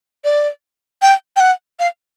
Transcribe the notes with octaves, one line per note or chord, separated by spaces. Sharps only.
D5
G5
G5
F#5
F5